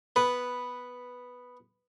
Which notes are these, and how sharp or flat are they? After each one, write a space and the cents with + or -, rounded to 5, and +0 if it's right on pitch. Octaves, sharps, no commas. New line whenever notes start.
B3 +0 B4 +0